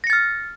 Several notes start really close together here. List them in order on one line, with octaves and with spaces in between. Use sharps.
A#6 C#7 A6 F6